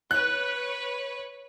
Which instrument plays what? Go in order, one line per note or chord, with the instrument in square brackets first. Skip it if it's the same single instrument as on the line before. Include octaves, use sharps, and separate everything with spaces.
[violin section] B4 C#5 [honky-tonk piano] F#6